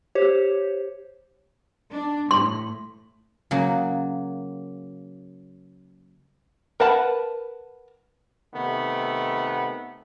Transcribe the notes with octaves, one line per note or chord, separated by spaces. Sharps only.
G4 C5 C#5
D4
A2 C6
C#3 F#3 A#3
A#4 B4 F#5 A5 B5
C3 D#3 A3 B3